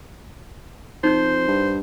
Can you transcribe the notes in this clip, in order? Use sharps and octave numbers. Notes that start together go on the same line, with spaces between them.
F2 D#4 C5 G6
G2